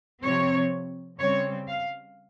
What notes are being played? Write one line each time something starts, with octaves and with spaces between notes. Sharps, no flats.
C3 F3 C4 C#5
C#3 G3 C4 C#5
F5